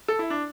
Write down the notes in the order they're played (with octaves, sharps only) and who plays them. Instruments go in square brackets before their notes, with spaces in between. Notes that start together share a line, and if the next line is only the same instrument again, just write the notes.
[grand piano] A4
E4
D4